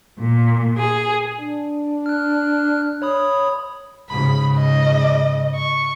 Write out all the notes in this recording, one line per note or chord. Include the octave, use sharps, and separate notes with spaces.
A#2
G#4
D4
F6 F#6
C#5 B5 D#6
G#2 C#3 B5
D#5
C#6